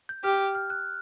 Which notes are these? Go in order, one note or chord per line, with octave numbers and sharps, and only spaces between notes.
G6
G4 F6
F6
F#6